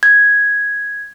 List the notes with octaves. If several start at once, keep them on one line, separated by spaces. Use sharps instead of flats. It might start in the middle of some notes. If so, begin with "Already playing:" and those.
G#6